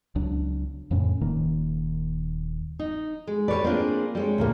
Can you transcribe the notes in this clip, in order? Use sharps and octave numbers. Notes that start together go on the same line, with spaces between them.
C#2 F#3 D4
F2 A2 C#3 C#4
D#1 D#3 A#3
D#4
G#3
G3 B4 C#5 D5
A#3 C4 D4 F4 G#4
G3 G#3 C#5
D2 A#2 A#3